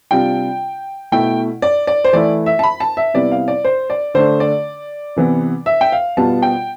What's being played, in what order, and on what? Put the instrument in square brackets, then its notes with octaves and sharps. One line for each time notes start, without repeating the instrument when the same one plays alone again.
[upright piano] C3 G3 D4 F4 G5
B2 A3 E4 G5
D5
D5
C5
E3 A3 E4 D5
E5
A5
B5
A5
E5
C3 G3 B3 E4 D5
F5
D5
C5
D5
D3 A3 D4 C5
D5
C3 E3 B3
E5
G5
F5
B2 G3 B3 F4 A5
G5